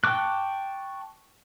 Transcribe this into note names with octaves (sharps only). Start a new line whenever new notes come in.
G5 A5 C#6 D6 F#6